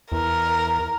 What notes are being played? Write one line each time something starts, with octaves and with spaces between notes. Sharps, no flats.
E2 A#4